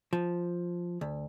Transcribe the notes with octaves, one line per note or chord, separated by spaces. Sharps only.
F3
D2